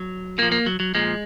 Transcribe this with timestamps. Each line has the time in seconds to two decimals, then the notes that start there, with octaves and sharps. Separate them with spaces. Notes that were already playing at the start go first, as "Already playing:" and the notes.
Already playing: F#3
0.38 A#2 F3 A#3
0.52 A#3
0.66 F#3
0.80 F#3
0.95 A#2 F3 G#3